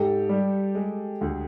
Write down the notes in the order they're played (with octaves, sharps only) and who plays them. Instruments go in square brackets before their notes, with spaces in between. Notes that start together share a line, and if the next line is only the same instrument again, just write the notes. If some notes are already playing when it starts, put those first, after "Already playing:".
Already playing: [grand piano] G#2 [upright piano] G4 A4
[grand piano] G3
G#3
D2